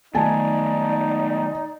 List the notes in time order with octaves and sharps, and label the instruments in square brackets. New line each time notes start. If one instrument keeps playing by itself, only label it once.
[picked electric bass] D#3 A3 B3 [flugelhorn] D#4 [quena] D5 [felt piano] G#5 A5